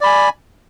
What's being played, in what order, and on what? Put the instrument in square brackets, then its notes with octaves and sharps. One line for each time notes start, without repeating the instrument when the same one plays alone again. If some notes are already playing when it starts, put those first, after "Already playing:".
[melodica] D5
B5
G#5